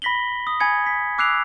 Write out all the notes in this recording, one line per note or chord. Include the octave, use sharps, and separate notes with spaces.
B5 A#6 B6 F#7 G7
D#6
G#5 B5 G#6 C#7
B6
D6 E6 F#6 C7 D7 F7